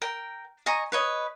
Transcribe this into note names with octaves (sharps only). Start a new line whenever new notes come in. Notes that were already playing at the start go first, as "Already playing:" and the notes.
A#4 G5
D#5 G#5 A#5 C#6
B4 C#5 D#5